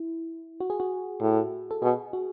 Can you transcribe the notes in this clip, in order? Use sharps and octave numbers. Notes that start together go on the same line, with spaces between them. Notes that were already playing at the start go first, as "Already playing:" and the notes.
Already playing: E4
F#4
G#4
F#4
A2
A4
B2 G#4
F#4